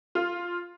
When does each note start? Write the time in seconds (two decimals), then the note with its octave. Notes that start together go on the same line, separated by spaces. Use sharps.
0.15 F4